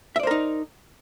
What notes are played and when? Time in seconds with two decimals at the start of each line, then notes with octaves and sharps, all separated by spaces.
0.16 E5
0.20 D5
0.23 C5
0.27 A#4
0.31 D#4